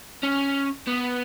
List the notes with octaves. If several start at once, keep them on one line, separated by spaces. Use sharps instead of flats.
C#4
B3